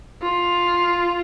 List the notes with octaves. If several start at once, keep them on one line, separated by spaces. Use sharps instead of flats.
F4